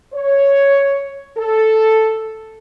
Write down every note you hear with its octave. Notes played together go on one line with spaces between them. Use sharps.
C#5
A4